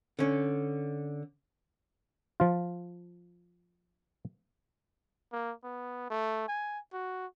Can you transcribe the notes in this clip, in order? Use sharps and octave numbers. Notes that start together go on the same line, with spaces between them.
D3 C#4
F3 F4
A#3
B3
A3
G#5
F#4